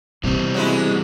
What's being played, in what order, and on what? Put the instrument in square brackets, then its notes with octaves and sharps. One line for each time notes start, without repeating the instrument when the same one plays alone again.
[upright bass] C3 B3 [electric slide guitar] E3 G3 C4
[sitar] F#3 G#3 E4